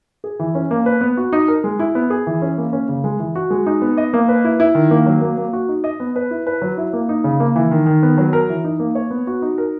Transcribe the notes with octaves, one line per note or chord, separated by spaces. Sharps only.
G#4
E3
C#4
A#3
B4
B3
F#4
D#4
A#4
G#3
E4
B3
G#4
E3
C#4
A#3
C#4
C#3
G#3
E3
F#4
G#3
D#4
B3
D#5
A#3
B4
E4
E4
D#3
A#3
F#3
A#3
A#3
F#4
D#4
D#5
B3
B4
E4
B4
F#3
E4
A#3
D#4
C#3
A#3
E3
D#3
D#3
B3
F#3
A#4
E3
D#4
A#3
C#5
B3
F#4
D#4
A#4